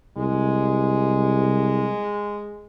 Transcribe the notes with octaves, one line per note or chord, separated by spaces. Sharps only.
C2 G#3